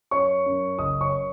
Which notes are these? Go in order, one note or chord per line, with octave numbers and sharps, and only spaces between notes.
F#2 C#5 C#6
F#2
F#1 D#5 D#6
C#5 C#6